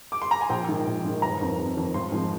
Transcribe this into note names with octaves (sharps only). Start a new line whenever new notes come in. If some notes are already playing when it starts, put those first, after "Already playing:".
D6
C6
A#5
G#5
A#1 G5
G#2 D#3
A#1
G#2 D#3
G1 A#5
F2 D#3
G1
F2 D#3
G#1 C6
G#2 F3